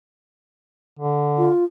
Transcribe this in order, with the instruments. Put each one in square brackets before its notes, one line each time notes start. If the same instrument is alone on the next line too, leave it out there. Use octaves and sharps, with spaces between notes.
[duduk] D3
[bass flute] F4